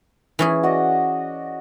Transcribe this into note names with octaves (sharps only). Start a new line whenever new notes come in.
E3 C#4 G#4
F#4 D5 D#5